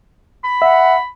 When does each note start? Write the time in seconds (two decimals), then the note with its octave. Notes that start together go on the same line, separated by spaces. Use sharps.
0.44 B5
0.62 E5 F#5